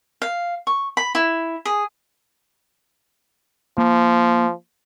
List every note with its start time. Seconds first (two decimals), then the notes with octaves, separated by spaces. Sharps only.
0.22 F5
0.67 C#6
0.97 B5
1.15 E4
1.65 G#4
3.78 F3 A#3